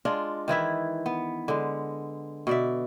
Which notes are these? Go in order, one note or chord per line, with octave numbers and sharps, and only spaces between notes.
G#3 D4 F4
D#3 E3 E4 E5
B3
D3 G#3
B2 D5 E5